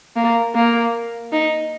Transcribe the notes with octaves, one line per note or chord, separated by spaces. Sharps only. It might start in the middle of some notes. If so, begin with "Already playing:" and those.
A#3
A#3
D#4